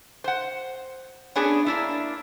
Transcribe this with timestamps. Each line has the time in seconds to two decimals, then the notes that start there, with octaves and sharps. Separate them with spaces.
0.24 C5 F#5
1.35 B3 C#4 D4 G#4
1.66 A#3 D4 E4